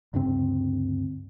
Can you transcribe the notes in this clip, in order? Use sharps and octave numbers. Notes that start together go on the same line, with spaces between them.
D2 G2 C#3 C4